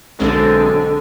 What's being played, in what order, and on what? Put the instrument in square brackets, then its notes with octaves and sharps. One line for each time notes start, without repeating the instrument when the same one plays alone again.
[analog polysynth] B1 G#3 C4 [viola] D3